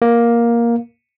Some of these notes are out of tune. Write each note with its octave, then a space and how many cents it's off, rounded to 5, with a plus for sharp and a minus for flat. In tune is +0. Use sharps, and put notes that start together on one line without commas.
A#3 +10